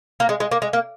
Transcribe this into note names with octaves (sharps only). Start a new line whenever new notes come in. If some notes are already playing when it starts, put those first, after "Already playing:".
A#3
G#3
G#3
A#3
G#3
A#3